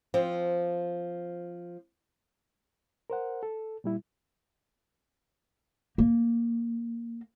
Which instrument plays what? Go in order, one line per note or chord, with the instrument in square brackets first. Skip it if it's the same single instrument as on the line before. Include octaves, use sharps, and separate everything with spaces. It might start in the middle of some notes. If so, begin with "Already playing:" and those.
[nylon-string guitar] F3 C4
[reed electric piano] A#4 C5 F#5
A4
A#2 G3 E4
[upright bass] A#3